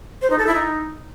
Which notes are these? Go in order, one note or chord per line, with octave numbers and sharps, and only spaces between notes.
C5
D#4
A4
E4
D#4